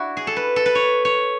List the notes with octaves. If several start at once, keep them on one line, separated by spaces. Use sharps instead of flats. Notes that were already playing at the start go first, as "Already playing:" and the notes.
Already playing: D4 E4 F#4
G#4
A4
B4
A4
B4
C#5
C#5